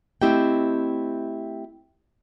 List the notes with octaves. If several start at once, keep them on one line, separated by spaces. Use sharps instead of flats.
A3 C4 E4 G4 D#5 G5